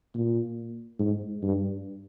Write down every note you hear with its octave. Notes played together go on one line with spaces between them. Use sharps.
A#2
G#2
G2